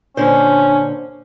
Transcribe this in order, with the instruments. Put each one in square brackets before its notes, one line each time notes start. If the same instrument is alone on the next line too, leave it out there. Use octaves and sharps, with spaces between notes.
[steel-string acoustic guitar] A#2 D3 C5 [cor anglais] C#4 [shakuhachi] D4